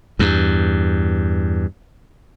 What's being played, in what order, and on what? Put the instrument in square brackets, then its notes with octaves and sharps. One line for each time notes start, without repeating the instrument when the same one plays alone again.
[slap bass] E2 G2